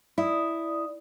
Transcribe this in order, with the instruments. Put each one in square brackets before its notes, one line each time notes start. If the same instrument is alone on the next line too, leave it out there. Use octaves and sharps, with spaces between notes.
[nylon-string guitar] E4 [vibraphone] D5 D#6